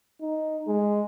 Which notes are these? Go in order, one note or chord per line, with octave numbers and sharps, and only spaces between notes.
D#4
G#3